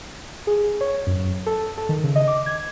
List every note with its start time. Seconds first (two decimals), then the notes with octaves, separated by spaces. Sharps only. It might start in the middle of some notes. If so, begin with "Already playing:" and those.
0.47 G#4
0.81 C#5
1.07 F#2
1.46 A4
1.78 A4
1.89 D#3
2.04 C#3
2.16 D#5
2.28 D6
2.46 G#6